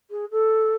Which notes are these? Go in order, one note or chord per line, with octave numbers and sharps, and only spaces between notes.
G#4
A4